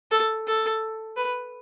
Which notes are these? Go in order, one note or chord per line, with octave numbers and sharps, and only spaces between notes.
A4
A4
B4